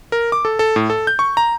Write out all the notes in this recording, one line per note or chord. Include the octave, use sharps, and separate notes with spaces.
A#4
D6
A4
A4
A2
A4
G6
C#6
A#5